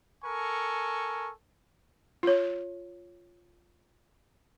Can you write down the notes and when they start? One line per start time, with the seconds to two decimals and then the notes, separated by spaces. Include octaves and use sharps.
0.25 A4 A#4 G#5 C#6
2.23 F4 C#5